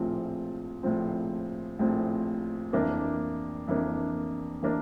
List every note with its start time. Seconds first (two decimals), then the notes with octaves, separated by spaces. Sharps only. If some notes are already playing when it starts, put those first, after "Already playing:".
Already playing: A#1 A2 F3 C4
0.83 A#1 A2 F3 C4
1.79 A#1 A2 F3 C4
2.72 F2 E3 A#3 D4
3.67 F2 E3 A#3 D4
4.63 E3 A#3 D4